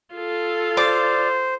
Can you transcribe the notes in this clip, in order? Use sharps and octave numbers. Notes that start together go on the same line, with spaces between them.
F4 A4
C5 D5 D6